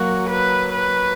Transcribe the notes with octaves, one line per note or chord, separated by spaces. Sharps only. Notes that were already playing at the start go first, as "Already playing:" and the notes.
Already playing: F#3 A#3 F#4
B4
B4